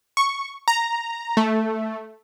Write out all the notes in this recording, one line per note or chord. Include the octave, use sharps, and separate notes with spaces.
C#6
A#5
A3